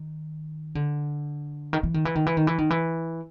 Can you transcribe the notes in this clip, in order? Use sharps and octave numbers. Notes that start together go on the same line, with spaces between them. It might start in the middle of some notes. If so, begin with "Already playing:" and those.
Already playing: D#3
D3
D#3
E3
D#3
E3
D#3
E3
D#3
E3
D#3
E3